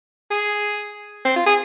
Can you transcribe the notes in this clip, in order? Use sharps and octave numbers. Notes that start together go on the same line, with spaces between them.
G#4
C4
F4
G#4